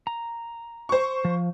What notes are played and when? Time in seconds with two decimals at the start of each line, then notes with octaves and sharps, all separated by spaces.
0.07 A#5
0.89 C5 C#6
1.25 F3